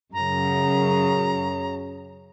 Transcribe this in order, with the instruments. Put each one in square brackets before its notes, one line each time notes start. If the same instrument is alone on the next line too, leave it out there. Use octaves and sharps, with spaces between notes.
[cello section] F#2 C#3 [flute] A#5